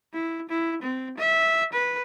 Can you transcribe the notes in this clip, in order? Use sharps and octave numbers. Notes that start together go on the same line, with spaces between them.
E4
E4
C4
E5
B4